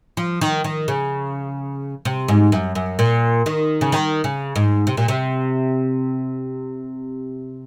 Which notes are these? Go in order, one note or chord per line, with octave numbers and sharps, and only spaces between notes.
F3
D#3
D#3
C#3
C3
G#2
F#2
F#2
A#2
D#3
C#3
D#3
C#3
G#2
C3
A#2
C3